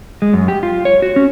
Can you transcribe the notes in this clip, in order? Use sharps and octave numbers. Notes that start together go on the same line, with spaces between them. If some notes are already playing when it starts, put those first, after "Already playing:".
G#3
F#2
G4
F4
C#5
F#4
C#4